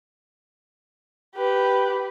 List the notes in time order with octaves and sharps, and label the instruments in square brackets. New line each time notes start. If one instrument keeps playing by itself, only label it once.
[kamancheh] G4 B4